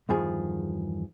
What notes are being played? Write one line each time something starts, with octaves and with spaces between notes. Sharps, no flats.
E2 G2 D#3 F3 G#4